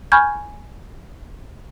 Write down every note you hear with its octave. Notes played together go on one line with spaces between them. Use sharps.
G#5 B5 C#6 F6 G6 G#6